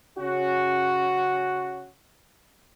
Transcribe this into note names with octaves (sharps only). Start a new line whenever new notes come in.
C#3 C#4 F#4